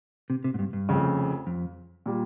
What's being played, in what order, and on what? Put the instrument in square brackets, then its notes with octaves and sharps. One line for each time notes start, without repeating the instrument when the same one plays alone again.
[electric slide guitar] C3
C3
G#2
G2
G2
[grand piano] F1 F2 C#3
[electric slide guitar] F2
[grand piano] A#2 G3